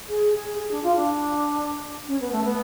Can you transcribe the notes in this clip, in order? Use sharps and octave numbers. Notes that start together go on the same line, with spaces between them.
G#4
G#4
G#4
D4
F4
D4
C#4
B3
A3
B3